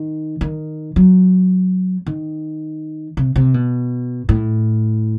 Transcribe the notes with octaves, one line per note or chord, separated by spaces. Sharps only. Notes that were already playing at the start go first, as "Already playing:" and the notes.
Already playing: D#3
D#3
F#3
D#3
C3
C3
B2
A2